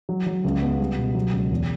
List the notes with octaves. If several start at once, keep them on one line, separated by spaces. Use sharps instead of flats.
F#3
F#3
C#2
B3
G3
B2
F#3
C#2
E2